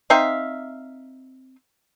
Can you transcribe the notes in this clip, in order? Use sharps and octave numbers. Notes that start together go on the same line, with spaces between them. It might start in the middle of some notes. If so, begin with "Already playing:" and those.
C4 D#4 E5 F5